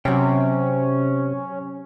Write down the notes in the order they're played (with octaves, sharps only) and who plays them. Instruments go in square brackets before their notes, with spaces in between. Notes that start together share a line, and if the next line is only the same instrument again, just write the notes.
[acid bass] C3 [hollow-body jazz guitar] F#3 G5 [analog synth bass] C#4